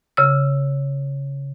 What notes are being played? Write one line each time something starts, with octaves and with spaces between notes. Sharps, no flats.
C#3 E6